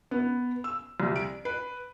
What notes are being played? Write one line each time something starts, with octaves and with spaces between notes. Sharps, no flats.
B3
E6
C2
D7
B4